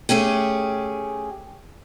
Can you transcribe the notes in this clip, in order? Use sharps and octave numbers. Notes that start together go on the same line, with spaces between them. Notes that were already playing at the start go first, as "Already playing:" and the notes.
A3 C#4 G4 G#4